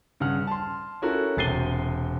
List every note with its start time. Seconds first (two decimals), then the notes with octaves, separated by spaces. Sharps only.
0.20 G2 C#3 F#5 F6
0.47 A5 C6
1.02 C#4 E4 F#4 A4 A#4
1.37 E1 C3 A6 C7 D#7 G7